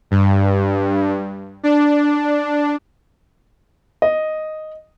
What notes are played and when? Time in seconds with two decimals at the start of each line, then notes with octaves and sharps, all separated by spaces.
0.11 G2
1.63 D4
4.02 D#5